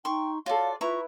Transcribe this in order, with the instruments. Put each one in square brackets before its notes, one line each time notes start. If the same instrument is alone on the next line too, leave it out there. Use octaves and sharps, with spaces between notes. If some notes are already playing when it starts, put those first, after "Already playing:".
[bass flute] D#4 [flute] G5 [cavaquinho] C6 C#6
[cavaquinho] F4 D5 [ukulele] F#4 A4 [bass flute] C#5 [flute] F5
[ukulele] E4 [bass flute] F4 [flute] B4 [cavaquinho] A#5 C#6